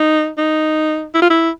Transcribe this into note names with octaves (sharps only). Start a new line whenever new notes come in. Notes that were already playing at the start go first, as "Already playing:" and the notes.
Already playing: D#4
D#4
E4
F4
E4